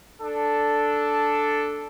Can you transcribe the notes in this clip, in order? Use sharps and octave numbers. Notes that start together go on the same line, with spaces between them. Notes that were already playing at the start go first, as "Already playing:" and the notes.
D4 A4